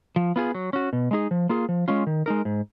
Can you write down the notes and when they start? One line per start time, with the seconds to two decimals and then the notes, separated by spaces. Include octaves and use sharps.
0.16 F3
0.36 B3 F4 G#4
0.55 F#3
0.73 C#4 F#4
0.93 B2
1.11 G#3 D#4 G#4
1.31 F3
1.49 A#3 F4 G#4
1.69 F3
1.88 G#3 C#4 F4
2.07 D#3
2.26 G#3 D#4 A#4
2.45 G#2